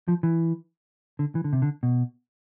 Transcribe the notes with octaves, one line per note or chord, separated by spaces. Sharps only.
F3
E3
D3
E3
D3
C3
D3
B2